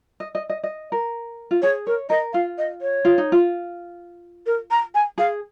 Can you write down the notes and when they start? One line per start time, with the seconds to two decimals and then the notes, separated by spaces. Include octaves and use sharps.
0.20 D#5
0.35 D#5
0.50 D#5
0.64 D#5
0.92 A#4
1.51 F4
1.62 G#4 C#5
1.87 A#4 C#5
2.09 A#4 D#5
2.33 F4 F5
2.58 D#5
2.82 C#5
3.05 F4
3.18 D#4
3.32 F4
4.46 A#4
4.71 A#5
4.95 G#5
5.18 G#4 F5